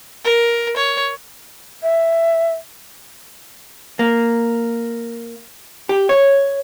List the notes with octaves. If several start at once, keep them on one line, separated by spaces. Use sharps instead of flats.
A#4
C#5
E5
A#3
G4
C#5